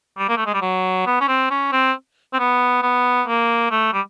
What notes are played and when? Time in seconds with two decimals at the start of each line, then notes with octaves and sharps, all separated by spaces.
0.18 G3
0.29 A#3
0.37 A3
0.46 G#3
0.54 G3
0.62 F#3
1.06 B3
1.20 C#4
1.28 C4
1.51 C#4
1.72 C4
2.33 C4
2.39 B3
2.82 B3
3.28 A#3
3.71 A3
3.93 G3